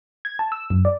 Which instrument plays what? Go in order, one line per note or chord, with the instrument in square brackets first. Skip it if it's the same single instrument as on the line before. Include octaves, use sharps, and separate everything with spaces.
[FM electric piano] G#6
A5
E6
F#2
D5